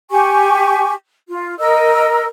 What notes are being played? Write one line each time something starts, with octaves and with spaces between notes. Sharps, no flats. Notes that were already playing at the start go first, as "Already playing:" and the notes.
G4 G#5 C#6
F4
A#4 D#5 E6